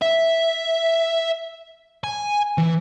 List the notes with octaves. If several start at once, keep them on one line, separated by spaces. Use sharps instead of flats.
E5
G#5
E3